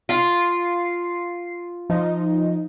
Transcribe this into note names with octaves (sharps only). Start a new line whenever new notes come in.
F4 C7
F3 D#4